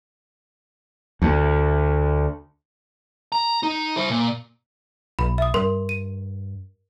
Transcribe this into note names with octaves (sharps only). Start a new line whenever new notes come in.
D2
A#5
D#4
E4 C5
A#2
B1 B5
E5 D#6
G2 A#4 C6
D#7